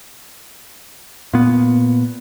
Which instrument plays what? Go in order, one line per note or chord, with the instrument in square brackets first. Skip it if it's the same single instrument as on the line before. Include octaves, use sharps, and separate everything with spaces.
[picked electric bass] A#2 B3